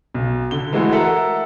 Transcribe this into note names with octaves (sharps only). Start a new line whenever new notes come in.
B1
D3 G7
E3 G#3 A3 F#4
A4 A#4 E5 F#5 A#5